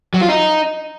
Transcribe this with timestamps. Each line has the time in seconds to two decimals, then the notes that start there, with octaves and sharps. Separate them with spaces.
0.14 F#3
0.21 F4
0.29 D#4